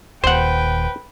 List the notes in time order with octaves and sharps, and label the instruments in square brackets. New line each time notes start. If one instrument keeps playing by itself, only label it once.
[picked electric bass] D#1 D#2 [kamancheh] B4 G5 [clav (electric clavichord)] C5 F#5